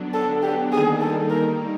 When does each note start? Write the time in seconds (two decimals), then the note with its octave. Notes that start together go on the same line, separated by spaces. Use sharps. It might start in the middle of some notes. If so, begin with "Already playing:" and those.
Already playing: D3 F#3 B3 D4
0.14 A4
0.43 G4
0.72 D#3 G3 A#3 D#4 G#4
1.01 A4
1.30 A#4